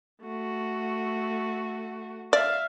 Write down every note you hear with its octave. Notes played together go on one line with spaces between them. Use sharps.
A3 F#4
D5 E5 F5